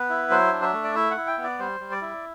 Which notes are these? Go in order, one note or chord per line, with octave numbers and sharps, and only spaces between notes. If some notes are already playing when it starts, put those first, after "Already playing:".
Already playing: B3 B4
E4
F#3 C5
D4
E5
A3
D5
E4 E5
F#5
E4
G5
B3
D5
G3 C5
G3
D5
E4